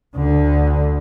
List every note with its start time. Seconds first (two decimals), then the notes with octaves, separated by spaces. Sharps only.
0.16 D2 D3